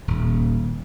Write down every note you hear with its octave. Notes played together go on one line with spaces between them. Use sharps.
D#1